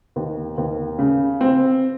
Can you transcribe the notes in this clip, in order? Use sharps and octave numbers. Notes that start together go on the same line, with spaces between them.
D#2
D#2
C#3
C4